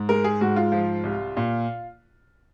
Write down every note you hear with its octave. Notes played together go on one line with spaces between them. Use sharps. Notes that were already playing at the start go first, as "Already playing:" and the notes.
Already playing: G#2
G#3 A#4
G#4
G#2 F#4
F4
F3
C2
A#2